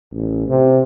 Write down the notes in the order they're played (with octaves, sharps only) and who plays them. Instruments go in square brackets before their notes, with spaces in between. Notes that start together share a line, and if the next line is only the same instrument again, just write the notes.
[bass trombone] A1
C3